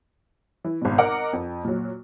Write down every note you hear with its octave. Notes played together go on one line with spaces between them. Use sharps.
E3
G#1 B2
A#4 D#5 F#5 A#5 D6
F2
A#2 F#3